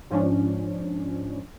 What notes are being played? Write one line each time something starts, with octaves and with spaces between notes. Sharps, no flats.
G#2 F3 G#3 C#4 D4